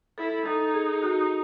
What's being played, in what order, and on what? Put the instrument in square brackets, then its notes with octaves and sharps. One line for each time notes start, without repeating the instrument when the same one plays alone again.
[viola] E4 [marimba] A4
[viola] D#4 [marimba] A4
[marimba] G#4
F#4